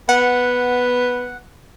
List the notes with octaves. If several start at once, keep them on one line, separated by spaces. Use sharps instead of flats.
B3 F#5